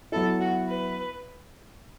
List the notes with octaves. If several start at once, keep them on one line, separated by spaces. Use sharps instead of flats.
F#3 B3 E4 A4
F#4
B4